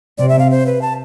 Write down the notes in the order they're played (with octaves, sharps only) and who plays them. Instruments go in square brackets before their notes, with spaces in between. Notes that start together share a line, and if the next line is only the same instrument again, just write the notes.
[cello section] C3 [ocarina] D5
[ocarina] E5
F5
C5
B4
A5